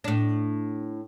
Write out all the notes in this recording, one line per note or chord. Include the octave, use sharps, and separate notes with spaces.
A2 D4